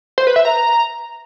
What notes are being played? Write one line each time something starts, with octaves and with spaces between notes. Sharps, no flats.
C5
B4
E5
A#5